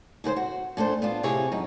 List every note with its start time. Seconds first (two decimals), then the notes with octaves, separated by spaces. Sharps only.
0.24 G#2 C#3 B4 C5
0.36 F#4
0.77 A#2 A3 D4 C5
1.02 B3 D4 F4
1.23 C3 C4 E4 G4 G#4 C#5
1.52 F#2 F#3 D#4